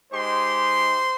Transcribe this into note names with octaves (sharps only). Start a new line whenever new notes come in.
G#3 D#4 G4 C5 C6